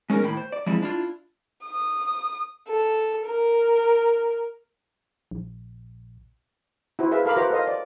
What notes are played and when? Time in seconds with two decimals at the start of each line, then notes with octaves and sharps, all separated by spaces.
0.10 G#3 C#4 D#4 A#4
0.22 D#2 A2 G5 B5
0.37 C5
0.52 D5
0.66 F3 G3 G#3 C4 E4
0.82 D4 E4 F4
1.65 D#6
2.69 A4
3.27 A#4
5.31 A#1
6.99 E4 F#4 C5
7.11 G#4 B4 E5 F5
7.25 A4 A#4 F5 B5 D6
7.36 F#4 B4 C5 E5 A#5 D6
7.50 A4 A#4 C5 D#5 F5
7.67 D5